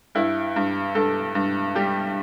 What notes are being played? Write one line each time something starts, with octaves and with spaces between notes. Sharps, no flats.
G2 E4
G2
G2 A4
G2
G3 G4